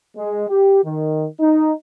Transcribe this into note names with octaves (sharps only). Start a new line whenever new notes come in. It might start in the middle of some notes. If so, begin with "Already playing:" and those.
G#3
G4
D#3
D#4